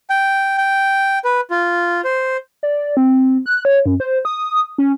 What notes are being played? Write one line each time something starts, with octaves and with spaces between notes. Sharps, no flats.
G5
G5
B4
F4
C5
D5
C4
F#6
C#5
F#2
C5
D#6
C#4